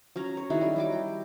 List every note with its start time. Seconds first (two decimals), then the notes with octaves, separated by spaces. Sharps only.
0.16 F#3 C#4 A#5
0.37 C#5
0.50 D#3 E4 F#4 G#4
0.61 G3
0.76 F#3 G3 D6
0.92 G5